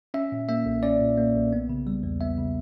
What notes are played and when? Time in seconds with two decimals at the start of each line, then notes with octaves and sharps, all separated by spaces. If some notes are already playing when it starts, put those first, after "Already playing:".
0.14 C#4 E5
0.32 A#2
0.49 A#3 E5
0.66 B1
0.83 C#4 D5
1.01 A#2
1.18 A#3
1.35 B1
1.53 B3
1.69 C#3
1.87 G3
2.03 E2
2.21 B3 E5
2.38 C#3